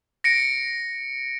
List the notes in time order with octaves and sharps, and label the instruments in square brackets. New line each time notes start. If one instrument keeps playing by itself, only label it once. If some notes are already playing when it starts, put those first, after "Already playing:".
[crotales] A#6 C#7 D7